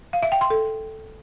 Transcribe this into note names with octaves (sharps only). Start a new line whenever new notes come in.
F5
E5
G5
C6
A4